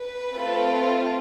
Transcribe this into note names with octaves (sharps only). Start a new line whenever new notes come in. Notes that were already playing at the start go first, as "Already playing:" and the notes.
Already playing: B4
A3 C4 F4 A4